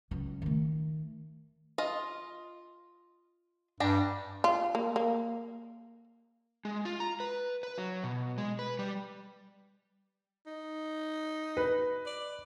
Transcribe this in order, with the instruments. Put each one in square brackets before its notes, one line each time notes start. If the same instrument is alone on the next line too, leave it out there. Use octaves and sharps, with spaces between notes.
[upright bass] C#2 F#3
D#3 A3
[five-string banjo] F4 D#5
[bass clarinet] G2 [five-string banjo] D4 G4 A#5
[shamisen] F4
A#3
A#3
[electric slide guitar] G#3
F4
A#5
B4
B4
F#3
B2
G#3
B4
G3
[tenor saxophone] D#4
[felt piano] B4
[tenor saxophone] D5